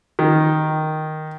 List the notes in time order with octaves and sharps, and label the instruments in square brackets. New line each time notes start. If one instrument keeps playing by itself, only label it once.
[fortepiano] D#3